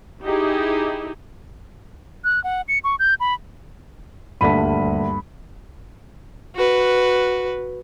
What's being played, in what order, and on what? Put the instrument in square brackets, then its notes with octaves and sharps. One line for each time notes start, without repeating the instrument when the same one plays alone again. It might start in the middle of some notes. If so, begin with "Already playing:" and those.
[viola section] D#4 E4 G4 G#4
[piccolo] F#6
F#5
C#7
C#6
G6
B5
[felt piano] D#1 D2 B6 [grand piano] G2 B5 D#7
[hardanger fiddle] F#4 B4